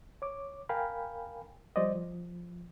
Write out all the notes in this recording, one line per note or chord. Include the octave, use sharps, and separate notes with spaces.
C#5 D6
A#4 F5 G5 G#5 B5
F3 G3 C5 D5 D#5
F3